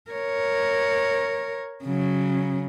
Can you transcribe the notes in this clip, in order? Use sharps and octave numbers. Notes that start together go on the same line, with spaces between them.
A#4 C#5
C#3 F#3